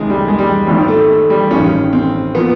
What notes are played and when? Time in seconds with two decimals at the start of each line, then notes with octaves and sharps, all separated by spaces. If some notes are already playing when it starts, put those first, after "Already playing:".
Already playing: C#2 C3 D#3 G#3
0.10 G3
0.28 G#3
0.38 G3
0.67 G#1 G#2 D#3 G3
0.88 A3
1.09 A3
1.30 G3
1.51 A1 G2 D#3 C#4
1.93 C4
2.35 A#2 F3 B3